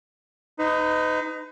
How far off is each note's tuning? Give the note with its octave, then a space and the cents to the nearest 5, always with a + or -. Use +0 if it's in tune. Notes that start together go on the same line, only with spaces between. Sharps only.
D#4 +0 B4 +40